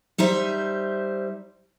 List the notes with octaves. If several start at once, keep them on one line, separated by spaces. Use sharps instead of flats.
G3 D#4 C5 E5